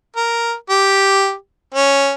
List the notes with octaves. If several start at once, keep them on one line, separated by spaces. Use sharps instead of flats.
A#4
G4
C#4